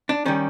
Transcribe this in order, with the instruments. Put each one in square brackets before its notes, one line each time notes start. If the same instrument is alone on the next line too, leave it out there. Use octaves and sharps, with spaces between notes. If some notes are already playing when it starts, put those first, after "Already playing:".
[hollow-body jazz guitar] D4
D#3 G3 C#4